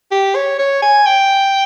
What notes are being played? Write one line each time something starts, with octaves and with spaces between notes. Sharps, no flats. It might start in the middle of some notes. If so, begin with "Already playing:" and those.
G4
C#5
C#5
G#5
G5